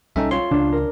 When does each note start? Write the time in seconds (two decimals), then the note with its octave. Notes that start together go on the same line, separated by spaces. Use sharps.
0.16 B1 G3 C#4 D#4 A4 E5
0.31 F4 C#5 C6
0.51 C#2 C#3 D4
0.72 A#4